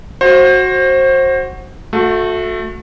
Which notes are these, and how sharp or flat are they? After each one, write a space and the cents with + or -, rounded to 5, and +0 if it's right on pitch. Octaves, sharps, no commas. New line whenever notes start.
F#4 +0 C5 +25
A3 +0 F#4 -30